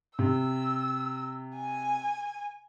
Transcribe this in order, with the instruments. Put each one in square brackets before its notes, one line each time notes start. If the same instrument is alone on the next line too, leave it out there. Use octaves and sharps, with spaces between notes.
[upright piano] C3 [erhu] E6
[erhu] G#5